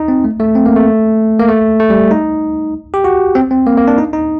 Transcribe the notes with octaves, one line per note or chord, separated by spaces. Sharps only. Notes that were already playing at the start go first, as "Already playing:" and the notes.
Already playing: D#4
C4
A3
A3
C4
A#3
A3
A#3
A3
A3
G3
D#4
G4
F#4
C4
C4
A#3
A#3
D4
D#4
D#4